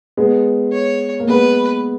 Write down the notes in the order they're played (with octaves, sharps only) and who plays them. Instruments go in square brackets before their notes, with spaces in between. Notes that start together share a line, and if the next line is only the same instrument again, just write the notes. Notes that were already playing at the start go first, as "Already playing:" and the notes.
[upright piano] G#3 B3
[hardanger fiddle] C#5
[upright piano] A#3
[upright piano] G#3 B3 [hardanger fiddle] B4